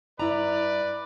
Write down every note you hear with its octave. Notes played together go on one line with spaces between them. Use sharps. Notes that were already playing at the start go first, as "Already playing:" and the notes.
G2 E4 B4 D5 A#5